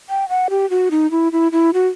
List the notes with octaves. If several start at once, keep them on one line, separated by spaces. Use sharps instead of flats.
G5
F#5
G4
F#4
D#4
E4
E4
E4
F#4